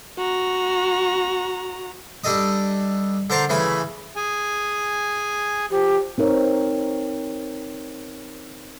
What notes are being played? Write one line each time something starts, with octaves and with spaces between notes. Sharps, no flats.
F#4 A#5
G3 D4 A4 D#5 D#6
D3 A#4 C5 A5 A#5 C6
C#3 E3 A3 G#5 B5
G#4 G#5
F3 G4
C4 D#4 A#4 C#5